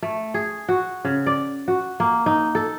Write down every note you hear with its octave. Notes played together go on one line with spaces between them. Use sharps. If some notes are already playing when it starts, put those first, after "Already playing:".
A3
G#4
F#4
C#3
D5
F#4
A#3
D#4
A4